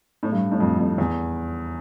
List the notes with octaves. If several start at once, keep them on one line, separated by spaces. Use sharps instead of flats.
A2
G2
A2
F2
F2
E2